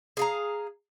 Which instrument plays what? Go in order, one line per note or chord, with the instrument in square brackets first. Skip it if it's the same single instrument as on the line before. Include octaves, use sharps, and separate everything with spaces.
[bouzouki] G#4 F5 A#5